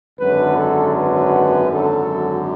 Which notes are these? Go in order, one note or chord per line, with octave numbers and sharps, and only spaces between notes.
G#1 F#2 D3 F#3 B4
A4
B4
G#1 F#2 D3 F#3 A4